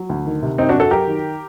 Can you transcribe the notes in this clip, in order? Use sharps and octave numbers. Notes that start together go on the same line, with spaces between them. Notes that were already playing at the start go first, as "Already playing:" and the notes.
Already playing: F#3
D2
D#3
C3
F#2 C4 D#4
D4 F#4
F#2
F#4 A4
F#3 G4 A#4
D#3